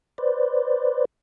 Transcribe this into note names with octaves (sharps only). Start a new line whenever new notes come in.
B4 C5 D5